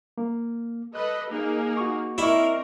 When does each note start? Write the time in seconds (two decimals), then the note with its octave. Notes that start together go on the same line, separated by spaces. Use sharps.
0.18 A#3
0.95 A4 B4 D#5 F#6
1.31 A#3 D#4 G#4
1.77 F#4 C#6
2.18 C4 E4 A#4 D5 D#5 C#6